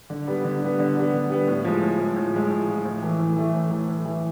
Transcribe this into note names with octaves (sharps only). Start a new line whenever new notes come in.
D3
G3 B3
D3
G3 B3
D3
G3 B3
D3
G3 B3
A2
F3 G#3
A2
F3 G#3
A2
F3 G#3
A2
F3 G#3
A2
E3 A3
A2
E3 A3
A2
E3 A3
A2
E3 A3